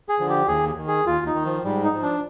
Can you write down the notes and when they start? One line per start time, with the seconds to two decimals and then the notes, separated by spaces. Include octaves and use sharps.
0.09 G#4
0.19 D3 F3
0.29 G4
0.48 D#2 G#4
0.78 D#3
0.88 G#4
1.06 D#2 F4
1.26 D#4
1.35 D#3
1.45 F3
1.64 G#2 G3
1.83 D#4
1.93 F3
2.03 D4